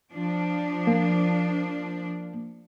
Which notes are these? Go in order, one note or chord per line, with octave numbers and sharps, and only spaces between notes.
F3 D4
A#3